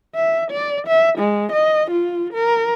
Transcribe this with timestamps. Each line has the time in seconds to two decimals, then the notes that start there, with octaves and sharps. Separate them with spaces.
0.16 E5
0.52 D5
0.87 E5
1.19 G#3
1.52 D#5
1.91 F4
2.34 A#4